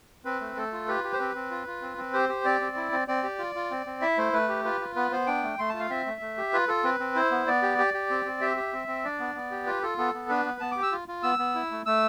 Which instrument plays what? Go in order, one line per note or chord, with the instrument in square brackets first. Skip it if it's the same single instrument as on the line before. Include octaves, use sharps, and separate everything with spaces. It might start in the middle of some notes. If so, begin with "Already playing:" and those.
[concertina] C4 B4
A3
A3 A4
F4
G4 B4
G4
C5
C4 B4
C4
F4
F4
C4
C4
G4 C5
G4
C4 D5
C4
E4
C4
C4 D5
G4
F4
F4
C4
C4
E4 E5
A3 C5
A3 B4
G4
F4 B4
F4
B3 B4
B3 C5
D4 G5
A3
A3 C6
F4 A5
F5
C4 E5
A3
A3
G4
F4 B4
F4 A4
C4 B4
C4
E4 C5
B3
B3 D5
G4
G4
G4
C4
C4
G4 E5
G4
C4
C4
D4 D5
B3
B3
G4
F4 B4
F4 A4
B3 A4
B3
D4 B4
B3
B3 A5
G4 D6
E6
F4
F4
B3 E6
B3
E4
A3
A3 E6